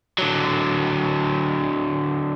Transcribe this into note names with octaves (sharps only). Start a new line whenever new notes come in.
D3 F#3